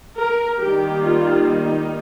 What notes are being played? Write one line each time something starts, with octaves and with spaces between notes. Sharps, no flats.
A#4
D#3 G3 A#3 G4
F4
D#4